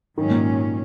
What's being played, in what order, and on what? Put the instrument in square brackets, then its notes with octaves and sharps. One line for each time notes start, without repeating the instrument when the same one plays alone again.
[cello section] G#2 F#3 C#4 [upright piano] D#3
[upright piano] A#2